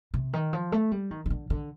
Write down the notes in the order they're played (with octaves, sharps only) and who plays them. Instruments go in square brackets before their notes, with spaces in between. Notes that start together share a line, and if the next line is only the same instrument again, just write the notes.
[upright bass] C3
D#3
F3
A3
G3
D#3
D#3
D3
D3